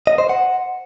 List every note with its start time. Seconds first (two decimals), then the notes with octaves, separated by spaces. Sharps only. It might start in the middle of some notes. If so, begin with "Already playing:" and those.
0.07 D#5
0.18 C5
0.29 F#5